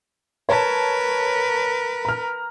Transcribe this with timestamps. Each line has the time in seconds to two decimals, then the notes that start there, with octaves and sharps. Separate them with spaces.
0.49 A#4 B4 C#5 A5
2.05 A#5 F6